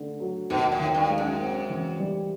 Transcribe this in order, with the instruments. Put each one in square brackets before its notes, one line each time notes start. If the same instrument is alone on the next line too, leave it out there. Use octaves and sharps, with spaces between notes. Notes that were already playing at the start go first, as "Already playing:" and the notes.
Already playing: [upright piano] D3 A3
F#3
[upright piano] D#2 [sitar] B2
[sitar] A2
[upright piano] D#3
[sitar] G2
[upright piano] G#3
[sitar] F#2
[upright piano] C4
E3
G3